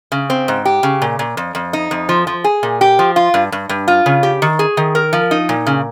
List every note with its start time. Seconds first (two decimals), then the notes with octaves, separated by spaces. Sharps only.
0.12 C#3
0.30 C4
0.48 G#2
0.65 G4
0.83 C#3
1.02 A#2
1.19 A#2
1.37 F2
1.55 F2
1.73 D#4
1.91 F2
2.09 F3
2.27 F3
2.44 G#4
2.63 A#2
2.81 G4
2.99 F3
3.16 F4
3.34 G2
3.52 G2
3.69 G2
3.88 F4
4.06 C#3
4.23 G4
4.42 D#3
4.59 G#4
4.77 D#3
4.95 A#4
5.13 F3
5.31 D#4
5.49 A#2
5.67 C#3